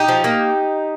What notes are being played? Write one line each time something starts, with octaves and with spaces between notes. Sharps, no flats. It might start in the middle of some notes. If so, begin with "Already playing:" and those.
Already playing: D#4 G4
F3
A#3